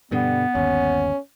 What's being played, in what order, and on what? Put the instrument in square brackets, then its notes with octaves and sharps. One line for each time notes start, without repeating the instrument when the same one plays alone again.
[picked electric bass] G2 B2 D3 [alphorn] G3 [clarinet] B3
[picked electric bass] G1 D#2 [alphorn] C#4